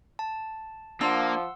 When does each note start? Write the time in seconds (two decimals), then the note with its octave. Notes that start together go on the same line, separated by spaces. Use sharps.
0.19 A5
1.01 F3 A#3 D4 F#5 C6 E6